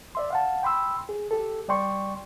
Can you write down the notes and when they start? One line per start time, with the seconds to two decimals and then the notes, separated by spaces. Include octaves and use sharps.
0.15 D5 E5 C6
0.30 F5 F#5 A5
0.63 G5 B5 C6 E6
1.09 G#4
1.31 G4 A4
1.68 G3 D5 G5 C6 C#6